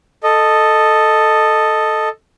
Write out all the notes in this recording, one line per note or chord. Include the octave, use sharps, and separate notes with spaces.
A4 D#5